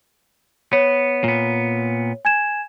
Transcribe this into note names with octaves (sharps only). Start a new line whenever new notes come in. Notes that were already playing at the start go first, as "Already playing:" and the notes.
B3 C#5
A#2 B3
G#5 G#6 E7